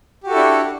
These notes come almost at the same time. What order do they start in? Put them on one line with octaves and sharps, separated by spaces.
G4 F#4 A4 E4 D4